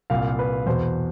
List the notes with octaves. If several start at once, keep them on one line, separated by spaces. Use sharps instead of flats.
C2 A#2 F5
B4
E2 B2 C5